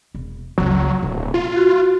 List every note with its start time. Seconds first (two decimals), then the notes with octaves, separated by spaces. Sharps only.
0.15 E1
0.58 F#1 C#2 F#3
1.03 D1 B2
1.34 F4
1.56 F#4